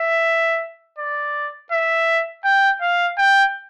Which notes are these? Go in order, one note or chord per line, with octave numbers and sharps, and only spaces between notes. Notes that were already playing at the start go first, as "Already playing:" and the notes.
Already playing: E5
D5
E5
G5
F5
G5